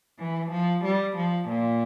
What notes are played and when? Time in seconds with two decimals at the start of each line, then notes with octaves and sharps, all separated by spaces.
0.19 E3
0.51 F3
0.84 G3
1.17 F3
1.49 A#2